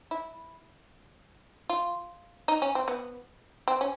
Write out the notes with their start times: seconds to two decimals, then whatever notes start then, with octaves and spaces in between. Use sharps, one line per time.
0.11 E4
1.70 F4
2.48 D#4
2.62 C#4
2.75 C4
2.88 B3
3.68 C4
3.81 C#4